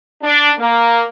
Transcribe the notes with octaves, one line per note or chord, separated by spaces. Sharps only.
D4
A#3